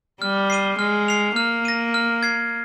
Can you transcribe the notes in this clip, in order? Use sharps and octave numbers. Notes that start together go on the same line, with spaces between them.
G3 F6
C7 D#7 G7
G#3 F6
C7 F7
A#3 F6
A#6 D#7
F6
G#6 C7